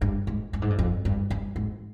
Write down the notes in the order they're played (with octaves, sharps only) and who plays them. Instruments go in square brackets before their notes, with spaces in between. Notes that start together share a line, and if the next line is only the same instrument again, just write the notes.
[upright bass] G2
G#2
G2
G#2
G2
F2
G2
G2
G#2